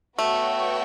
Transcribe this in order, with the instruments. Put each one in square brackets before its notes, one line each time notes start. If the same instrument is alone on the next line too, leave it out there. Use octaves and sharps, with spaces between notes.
[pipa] A3 [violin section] B3 F#4 C#5 G5